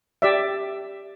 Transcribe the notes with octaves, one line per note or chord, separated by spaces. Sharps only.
G4 D5 E5